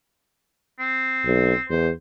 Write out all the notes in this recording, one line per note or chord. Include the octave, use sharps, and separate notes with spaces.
C4
B1
E2 C5